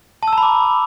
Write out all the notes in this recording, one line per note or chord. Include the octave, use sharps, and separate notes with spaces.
A5
E6
A#5
B5
D6